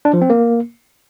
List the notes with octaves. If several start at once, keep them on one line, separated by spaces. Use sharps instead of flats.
D4
F3
C4
A#3